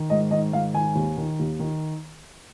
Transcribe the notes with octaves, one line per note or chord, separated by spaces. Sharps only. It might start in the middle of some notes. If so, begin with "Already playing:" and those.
Already playing: D#3
G#2 D#5
D#3 D#5
G#2 F5
D#3 G#5
D#2
D#3
D#2
D#3